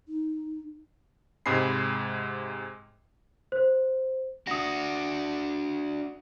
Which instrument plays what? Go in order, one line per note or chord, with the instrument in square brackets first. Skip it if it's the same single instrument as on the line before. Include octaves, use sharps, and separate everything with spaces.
[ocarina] D#4
[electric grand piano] G#2 C3 G#3 G#4 B5 C7
[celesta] C5
[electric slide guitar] D4 F#4 [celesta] D#6 A#6